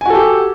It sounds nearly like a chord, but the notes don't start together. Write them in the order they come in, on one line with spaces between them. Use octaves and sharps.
G#5 F#4 A4 G4